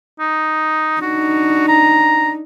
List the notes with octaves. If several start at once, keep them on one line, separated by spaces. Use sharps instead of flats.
D#4
D4 D#4 F#4
A#5